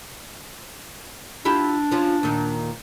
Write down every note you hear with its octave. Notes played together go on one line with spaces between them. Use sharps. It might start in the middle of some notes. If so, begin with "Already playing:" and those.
D4 E4 F4 G4
F3 C#4 F4
D#2 A#2 D#3